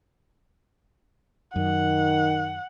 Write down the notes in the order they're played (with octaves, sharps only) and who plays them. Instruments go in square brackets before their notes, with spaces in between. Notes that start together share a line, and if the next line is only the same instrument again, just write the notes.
[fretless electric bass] F#2 [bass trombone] D#3 [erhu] F#5